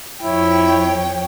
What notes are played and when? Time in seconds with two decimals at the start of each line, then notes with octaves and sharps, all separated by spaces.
0.23 F2 E4 C#5 G5